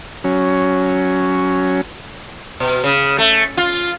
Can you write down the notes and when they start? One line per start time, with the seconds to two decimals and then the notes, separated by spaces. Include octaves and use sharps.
0.24 F#3 C#4
2.60 B2
2.84 C#3
3.18 A3
3.57 F4